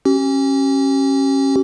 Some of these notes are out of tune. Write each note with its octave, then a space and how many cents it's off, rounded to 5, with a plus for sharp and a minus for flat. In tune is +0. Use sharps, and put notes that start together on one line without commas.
C#4 -25 G4 -35